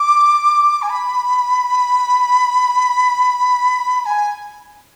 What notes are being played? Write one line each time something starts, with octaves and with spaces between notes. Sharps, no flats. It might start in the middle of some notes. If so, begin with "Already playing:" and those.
Already playing: D6
G#5
B5
B5
G#5